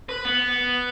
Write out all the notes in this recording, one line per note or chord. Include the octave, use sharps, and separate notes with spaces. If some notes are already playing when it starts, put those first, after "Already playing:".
B4
B3